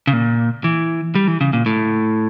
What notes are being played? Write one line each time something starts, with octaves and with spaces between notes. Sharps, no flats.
C#3
A#2
E3
G3
E3
C#3
A#2
A2